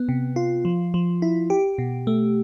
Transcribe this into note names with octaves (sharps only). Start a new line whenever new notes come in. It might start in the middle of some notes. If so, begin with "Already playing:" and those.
Already playing: B3
C3
F4
F3
F3
E4
G4
B2
A3